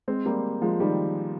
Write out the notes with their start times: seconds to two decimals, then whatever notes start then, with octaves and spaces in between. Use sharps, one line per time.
0.08 G#3 C4
0.26 G3 A#3
0.62 F3 G#3
0.80 D#3 G3